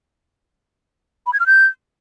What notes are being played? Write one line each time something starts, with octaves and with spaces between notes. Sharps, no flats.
B5
G#6
F6
G6